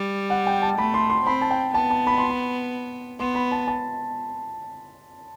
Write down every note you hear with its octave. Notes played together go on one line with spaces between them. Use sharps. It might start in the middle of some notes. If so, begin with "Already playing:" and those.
Already playing: G3
F#5
G5
A5
A3 B5
C6
C6
C4 B5
A5
G5
B3 A5
A5
B5
C6
B5
B3 C6
B5
A5
A5